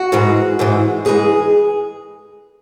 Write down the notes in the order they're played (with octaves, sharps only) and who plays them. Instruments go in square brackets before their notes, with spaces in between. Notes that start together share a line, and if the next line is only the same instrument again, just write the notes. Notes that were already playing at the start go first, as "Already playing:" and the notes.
Already playing: [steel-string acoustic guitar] F#4
G#2 E3 G#3
G#2 E3 G#3
G#2 E3 G#3 G#4